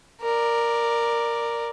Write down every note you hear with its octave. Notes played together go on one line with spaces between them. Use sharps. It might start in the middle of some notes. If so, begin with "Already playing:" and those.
A#4 D5